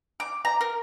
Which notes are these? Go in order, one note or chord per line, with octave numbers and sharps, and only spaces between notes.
D6
A#5
A#4